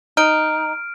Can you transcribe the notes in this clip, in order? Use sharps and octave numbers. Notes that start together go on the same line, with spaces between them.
D#4 F6 D7